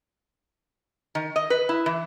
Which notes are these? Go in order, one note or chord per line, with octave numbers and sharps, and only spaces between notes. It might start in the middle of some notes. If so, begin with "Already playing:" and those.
D#3
D#5
B4
E4
E3